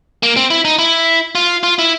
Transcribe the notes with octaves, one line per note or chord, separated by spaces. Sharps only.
A#3
C4
E4
D#4
E4
F4
F4
E4